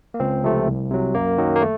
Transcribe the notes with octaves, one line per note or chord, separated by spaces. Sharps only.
A#3
C#2 C4
C3 F3 A3
C2
C3 F#3
F#2 A#3
D#3 F#3
A#3
A3